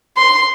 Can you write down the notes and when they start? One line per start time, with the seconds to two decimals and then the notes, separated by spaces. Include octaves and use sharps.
0.17 C6